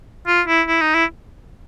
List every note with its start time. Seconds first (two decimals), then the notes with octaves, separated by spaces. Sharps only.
0.27 F4
0.48 E4
0.68 E4
0.81 D#4
0.94 E4